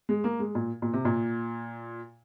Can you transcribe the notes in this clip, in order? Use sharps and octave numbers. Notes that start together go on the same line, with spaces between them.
G#3
A#3
G#3
A#2
A#2
C3
A#2